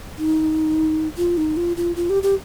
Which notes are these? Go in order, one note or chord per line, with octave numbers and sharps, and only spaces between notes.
D#4
F4
D#4
F4
F4
F4
G4
G4